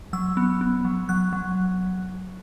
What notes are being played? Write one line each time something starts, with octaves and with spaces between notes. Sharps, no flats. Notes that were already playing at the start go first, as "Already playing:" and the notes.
F#3 E6
B3
B3
F#3
F#3 F#6
F#3